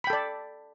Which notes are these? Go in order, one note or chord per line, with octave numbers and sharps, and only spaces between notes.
A4 D5 G5 B5